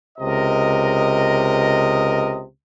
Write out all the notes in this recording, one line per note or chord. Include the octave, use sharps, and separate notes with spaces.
C#2 C3 A#4 D#5